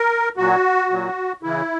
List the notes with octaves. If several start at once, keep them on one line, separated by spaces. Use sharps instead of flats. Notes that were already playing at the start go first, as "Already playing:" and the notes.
Already playing: A#4
A#2 F#3 F#4
A#2 F#3
C#3 E3 E4